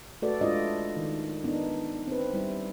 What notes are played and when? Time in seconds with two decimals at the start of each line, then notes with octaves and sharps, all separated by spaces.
0.22 A3 F#4 A4 B4 D5
0.41 G#3 D4 E4 F4 D5 D#5
0.97 D#3
1.44 B3 D4 D#4
2.08 C4 B4
2.34 G3 E4